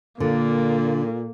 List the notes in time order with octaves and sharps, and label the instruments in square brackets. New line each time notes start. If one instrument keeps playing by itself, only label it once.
[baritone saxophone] A#2 [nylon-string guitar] D3 [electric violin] A#3